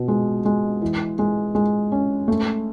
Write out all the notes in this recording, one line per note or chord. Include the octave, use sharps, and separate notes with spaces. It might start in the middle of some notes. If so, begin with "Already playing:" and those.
Already playing: B2
G#3
G#3
E3
G#3
G#3
C#4
A3